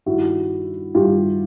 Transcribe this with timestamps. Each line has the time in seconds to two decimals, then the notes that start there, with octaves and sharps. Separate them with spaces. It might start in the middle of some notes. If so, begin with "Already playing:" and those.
0.06 G2 D#3 G3 E4 F#4
0.95 G2 D#3 G3 F4 G4